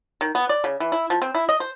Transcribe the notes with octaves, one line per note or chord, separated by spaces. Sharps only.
D#3
B3
D5
C#3
E3
E4
F3
C4
E4
D#5
C5